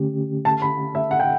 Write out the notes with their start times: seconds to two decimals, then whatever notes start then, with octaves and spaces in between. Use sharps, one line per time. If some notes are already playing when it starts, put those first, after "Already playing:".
Already playing: D3 A3 C#4 G4
0.45 A5
0.62 B5
0.95 E5
1.11 F#5
1.20 G5